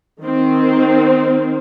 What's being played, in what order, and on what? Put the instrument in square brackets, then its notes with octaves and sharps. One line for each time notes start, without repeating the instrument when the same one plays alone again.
[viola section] D#3 C4